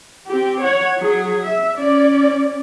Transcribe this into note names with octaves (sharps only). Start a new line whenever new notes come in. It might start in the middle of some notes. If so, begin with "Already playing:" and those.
C4 G4
C#5 F#5
F#3 G#4
E5
C#4 D5